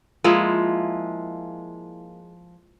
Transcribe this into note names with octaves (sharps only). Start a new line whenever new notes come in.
F3 G#3 A#3 E4